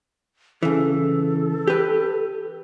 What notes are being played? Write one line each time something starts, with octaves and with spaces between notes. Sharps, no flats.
C#3 E3 A4
G4 B4